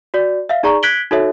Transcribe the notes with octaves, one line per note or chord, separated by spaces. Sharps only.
F#4 D5
E5 F5
D#4 G#4 D5 A#5 C#6
F#6 G#6 B6 D7 F#7 G7
D#4 F#4 A4 C#5 E5